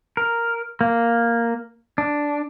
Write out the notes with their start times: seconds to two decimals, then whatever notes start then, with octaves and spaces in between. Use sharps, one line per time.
0.17 A#4
0.81 A#3
1.98 D4